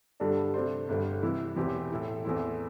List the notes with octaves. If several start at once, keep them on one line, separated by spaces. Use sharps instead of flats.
G2 D3 G3 D4 A4
C3 A3 D4 C5
G1 G2 D3 G3
C3 E3 G3 E4
E1 E2 E3 C4 G4
A2 A3 E4
E2 E3 A3 C4 E4